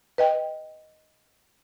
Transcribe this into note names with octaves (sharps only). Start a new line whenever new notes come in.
B4 D#5 G5